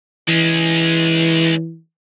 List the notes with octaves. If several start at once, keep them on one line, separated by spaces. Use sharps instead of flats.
E3 G#3 C#4